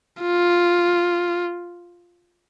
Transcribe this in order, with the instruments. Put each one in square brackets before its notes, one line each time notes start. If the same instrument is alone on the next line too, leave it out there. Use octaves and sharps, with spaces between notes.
[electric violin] F4